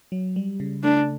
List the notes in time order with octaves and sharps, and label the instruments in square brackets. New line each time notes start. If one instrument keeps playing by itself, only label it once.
[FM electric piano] F#3
G3
C#3
[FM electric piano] A3 [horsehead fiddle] D4